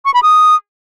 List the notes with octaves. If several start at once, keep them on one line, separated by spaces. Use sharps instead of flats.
C#6
B5
D#6